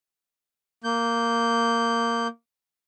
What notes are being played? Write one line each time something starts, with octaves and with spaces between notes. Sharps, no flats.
A#3 G6